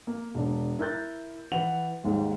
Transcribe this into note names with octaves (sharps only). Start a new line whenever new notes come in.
A#3
E1 D4
E4 A#4 F#6 G6 A6
E3 B4 F#5 F7
G#1 D#2 G#2